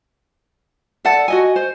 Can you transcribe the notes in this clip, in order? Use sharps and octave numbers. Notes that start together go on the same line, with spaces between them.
A4 D5 F#5 A5
F#4 D#5 G#5
C5